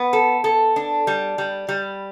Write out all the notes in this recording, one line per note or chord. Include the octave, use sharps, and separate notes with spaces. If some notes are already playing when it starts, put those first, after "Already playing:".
Already playing: B3
A4
A4
D4
G3
G3
G3